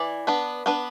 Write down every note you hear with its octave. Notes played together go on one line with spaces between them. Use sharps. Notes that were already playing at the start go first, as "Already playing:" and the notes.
Already playing: E3 D5
B3 D4 B4
B3 D4 B4